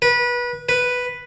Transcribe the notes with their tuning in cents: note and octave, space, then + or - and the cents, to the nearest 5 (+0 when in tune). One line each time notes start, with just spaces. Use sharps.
B4 -25
B4 +0